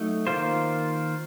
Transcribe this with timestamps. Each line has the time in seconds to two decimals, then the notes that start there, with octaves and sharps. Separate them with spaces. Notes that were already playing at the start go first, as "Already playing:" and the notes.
Already playing: F#3 A3 D#4
0.27 D#3 A#3 F4 C5